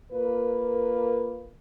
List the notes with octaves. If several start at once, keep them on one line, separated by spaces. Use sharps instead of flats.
A#3 F4 A#4 B4